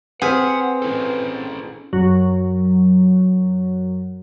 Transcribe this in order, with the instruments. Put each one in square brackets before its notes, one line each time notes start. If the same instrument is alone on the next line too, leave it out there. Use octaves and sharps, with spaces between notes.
[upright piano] C4 F6 B6 [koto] G#4 [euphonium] B4 [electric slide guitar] F#5
[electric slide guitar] C#4 E4 A4
[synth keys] F#2 F#3